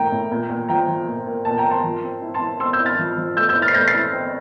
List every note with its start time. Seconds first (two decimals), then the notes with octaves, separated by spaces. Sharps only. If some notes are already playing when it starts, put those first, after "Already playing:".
Already playing: A2 A#3 G5 A#5
0.12 A2
0.32 A#2
0.50 A#2
0.69 F3 G5 A#5
0.88 F3
1.07 A#2
1.27 A#3
1.45 A#2 A5
1.58 G5 A#5
1.65 A#3
1.70 A5 C6
1.84 F3
2.04 C4
2.22 E4
2.34 A5 C6
2.41 E4
2.60 C4 C6 E6
2.73 E6 G6
2.80 E4
2.86 F6 A6
2.99 F3
3.18 F3
3.36 A3 E6 G6
3.49 E6 G6
3.56 E4
3.62 F6 A6
3.68 C7
3.74 A3 G6 A#6
3.88 A6 C7
3.94 E4
4.13 C4